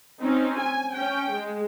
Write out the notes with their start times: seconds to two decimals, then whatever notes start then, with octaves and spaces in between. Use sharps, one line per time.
0.22 C4 C#4 D#4
0.57 G#5
0.93 C#4 G5
1.32 G#3